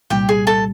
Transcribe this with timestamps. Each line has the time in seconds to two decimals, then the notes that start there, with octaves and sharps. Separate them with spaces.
0.10 C2 A#2 G3 G4 G5
0.29 G#4 G#5
0.47 A4 A5